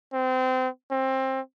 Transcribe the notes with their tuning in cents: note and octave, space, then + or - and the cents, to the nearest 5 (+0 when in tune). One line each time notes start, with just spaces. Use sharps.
C4 -25
C4 +20